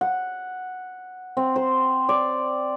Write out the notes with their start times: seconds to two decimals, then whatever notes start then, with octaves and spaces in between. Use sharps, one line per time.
0.01 F#5
1.37 C4
1.56 C5
2.09 D5